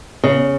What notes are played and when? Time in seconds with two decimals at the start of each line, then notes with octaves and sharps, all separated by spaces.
0.24 C#3